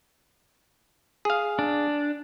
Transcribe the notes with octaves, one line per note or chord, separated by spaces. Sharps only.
G#4 F5
D4